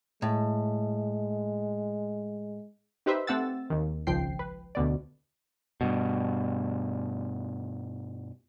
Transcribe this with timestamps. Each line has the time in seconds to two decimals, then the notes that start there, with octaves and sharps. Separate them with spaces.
0.22 A2 G#3
3.06 D#4 G4 B4 C5 E5
3.27 A3 C4 G4 F#5 E6 A6
3.70 D#2 D#3
4.07 G#1 C#2 F3 G5 C7
4.39 B4
4.75 D2 B2 D5
5.81 G2 B2